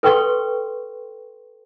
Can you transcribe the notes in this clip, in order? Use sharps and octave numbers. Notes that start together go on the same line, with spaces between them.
A4 B4 G5 C6 C#6